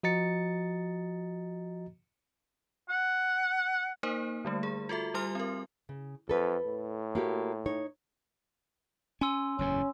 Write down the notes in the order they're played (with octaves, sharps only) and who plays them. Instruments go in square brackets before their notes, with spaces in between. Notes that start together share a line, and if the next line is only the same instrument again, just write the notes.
[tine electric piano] F3 F#4 D#5 A#5 A6 C#7
[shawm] F#5
[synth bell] A#3 D#4 A#4 C5
D3 G3 A3
G#4
F4 F#4 A4 E5
G3 F4 G4 G#5 C6 F6
C4 A#4
[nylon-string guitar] C#3
[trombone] F2 [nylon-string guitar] A4 B4
[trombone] A2
[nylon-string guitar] A#3 F#4 G4
D#4 C#5
[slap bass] C#4 [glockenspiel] G#5 C6 E6
[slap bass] F#1 E2 A2 [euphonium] C#4